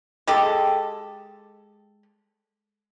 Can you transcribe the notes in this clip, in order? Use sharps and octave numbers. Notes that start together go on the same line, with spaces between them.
G#3 G4 A4